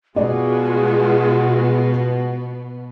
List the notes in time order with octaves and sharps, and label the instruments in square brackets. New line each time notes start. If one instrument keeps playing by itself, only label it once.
[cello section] B2 B3 [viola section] G#3 F4 F#4 [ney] G#4 [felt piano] D5